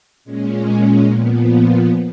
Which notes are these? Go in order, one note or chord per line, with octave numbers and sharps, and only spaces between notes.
A#2 G#3 C#4
A#2 F3 B3